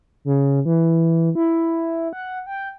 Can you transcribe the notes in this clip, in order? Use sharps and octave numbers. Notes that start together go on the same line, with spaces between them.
C#3
E3
E4
F#5
G5